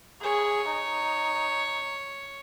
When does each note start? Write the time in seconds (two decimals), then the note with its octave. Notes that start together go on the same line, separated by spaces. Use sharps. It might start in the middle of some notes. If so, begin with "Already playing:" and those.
0.23 G#4 C#5
0.72 D#4